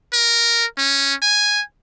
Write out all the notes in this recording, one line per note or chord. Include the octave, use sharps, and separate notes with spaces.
A#4
C#4
G#5